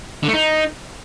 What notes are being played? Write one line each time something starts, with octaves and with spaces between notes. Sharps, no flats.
D3
A3
D#4